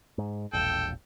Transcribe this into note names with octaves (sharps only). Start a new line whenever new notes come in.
G#2
E1 A#1 A4 G5